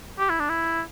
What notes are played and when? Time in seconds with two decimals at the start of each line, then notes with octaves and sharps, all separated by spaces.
0.19 G4
0.29 E4
0.39 D4
0.49 E4